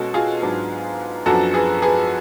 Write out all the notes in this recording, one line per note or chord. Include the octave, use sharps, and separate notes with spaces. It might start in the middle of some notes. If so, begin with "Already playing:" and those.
Already playing: B2 G#3 C#4 F#4 A4
F4 G#4
G#2 F#3 B3 D4
F#2 F3 B3 D4 F#4 A4
G#4 B4
G#4 B4